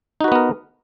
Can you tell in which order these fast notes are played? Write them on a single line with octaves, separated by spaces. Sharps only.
D#4 F#4 B4 B3 A#4